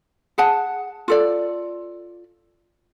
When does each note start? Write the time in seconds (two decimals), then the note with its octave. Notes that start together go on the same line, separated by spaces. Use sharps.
0.38 G#4 F#5 A5
1.08 F4 A4 D5